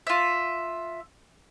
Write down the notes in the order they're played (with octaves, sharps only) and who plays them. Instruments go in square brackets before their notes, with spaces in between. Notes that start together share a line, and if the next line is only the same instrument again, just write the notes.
[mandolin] F4 E5